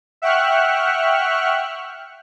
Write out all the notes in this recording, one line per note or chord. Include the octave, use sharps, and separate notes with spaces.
E5 F#5 G5 C#6 F6 F#6